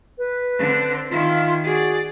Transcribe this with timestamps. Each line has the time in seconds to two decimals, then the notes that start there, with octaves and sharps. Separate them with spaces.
0.18 B4
0.59 D3 C4
1.10 D#3 E4 F4
1.64 F#4 G#4 D5